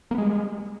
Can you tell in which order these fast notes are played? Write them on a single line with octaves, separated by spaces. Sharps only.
A#3 B3 G#3 G3